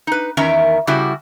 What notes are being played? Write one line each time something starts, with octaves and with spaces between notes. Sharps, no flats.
D#4 B4
E2 D#3 C#4 A#4 E5 A#5
C#3 G3 E4 F#4